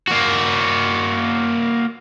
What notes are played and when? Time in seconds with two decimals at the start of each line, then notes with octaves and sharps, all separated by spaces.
0.08 A#3 F#4